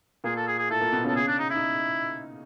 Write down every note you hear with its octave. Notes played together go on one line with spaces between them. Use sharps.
A#2 A#3 G#4
A4
G#4
G#4
A2 A3 A4
A#2 A#3
B2 B3
C#3 C#4 A4
G#4
D4
D#4
D#4 E4